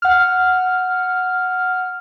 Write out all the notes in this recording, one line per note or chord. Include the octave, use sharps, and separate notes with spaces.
F#5 F6